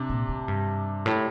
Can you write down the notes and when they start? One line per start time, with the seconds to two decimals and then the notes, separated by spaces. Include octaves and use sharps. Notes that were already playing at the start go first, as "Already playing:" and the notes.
Already playing: C3 D4
0.10 A#2
0.29 A2
0.48 G2
1.06 A2